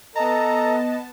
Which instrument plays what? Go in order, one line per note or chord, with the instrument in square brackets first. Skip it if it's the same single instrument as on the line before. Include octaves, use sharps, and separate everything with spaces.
[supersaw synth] B3 A5 [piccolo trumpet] A4 [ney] D#5 [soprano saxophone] A#5